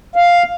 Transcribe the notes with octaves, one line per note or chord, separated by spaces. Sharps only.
F5